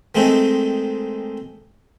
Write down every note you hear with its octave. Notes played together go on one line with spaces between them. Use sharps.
D#3 G#3 A3 C4 D#4